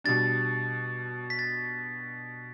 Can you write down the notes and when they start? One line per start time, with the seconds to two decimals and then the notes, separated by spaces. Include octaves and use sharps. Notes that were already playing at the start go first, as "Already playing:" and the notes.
0.04 B2 G3 D4 A6
1.30 B6
1.39 A6